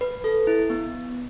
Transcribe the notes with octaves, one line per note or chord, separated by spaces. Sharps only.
B4
A4
E4
B3